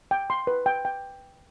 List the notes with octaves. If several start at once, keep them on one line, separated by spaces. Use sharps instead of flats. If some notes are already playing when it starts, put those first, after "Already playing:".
G5
C6
B4
G5
G5